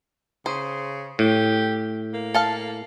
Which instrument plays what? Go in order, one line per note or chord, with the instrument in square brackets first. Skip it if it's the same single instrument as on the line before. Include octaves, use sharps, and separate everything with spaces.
[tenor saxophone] C#3 [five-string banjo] C5
[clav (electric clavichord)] A2 [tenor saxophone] G4
[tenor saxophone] A#3
[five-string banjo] A4 F5 A5